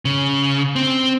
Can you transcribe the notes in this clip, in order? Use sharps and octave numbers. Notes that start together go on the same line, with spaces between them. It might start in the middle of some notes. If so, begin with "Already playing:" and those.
C#3
C4